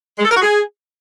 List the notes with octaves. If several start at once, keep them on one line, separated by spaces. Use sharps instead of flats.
G#3
A4
A#4
F#4
G#4